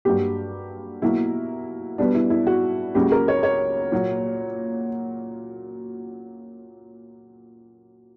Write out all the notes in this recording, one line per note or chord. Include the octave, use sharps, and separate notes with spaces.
G2 F#3 A#3 G4
B2 F#3 A#3 E4
B2 G3 B3 D4
E4
E4
F#4
C#2 C#3 F#3 A#3 G4
A#4
C#5
C#5
A#2 F#3 A#3